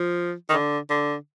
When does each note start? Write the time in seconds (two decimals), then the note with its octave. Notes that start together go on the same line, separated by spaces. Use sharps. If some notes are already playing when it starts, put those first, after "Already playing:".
Already playing: F3
0.50 D#3
0.53 D3
0.90 D3